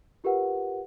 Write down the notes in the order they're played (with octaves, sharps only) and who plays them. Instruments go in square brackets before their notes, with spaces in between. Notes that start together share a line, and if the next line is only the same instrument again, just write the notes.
[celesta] F4 G4 A#4 B4 F#5